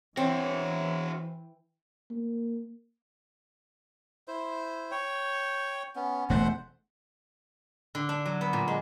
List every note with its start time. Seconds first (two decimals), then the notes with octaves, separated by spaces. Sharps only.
0.17 E3 C4 E4 F#4 C#5
2.10 A#3
4.28 E4 C5
4.91 C#5 G5
5.96 B3 C#4
6.30 E1 A3 C5 F#5
7.95 D3
8.09 D4
8.25 F#3
8.41 B3
8.53 A#2
8.68 G#3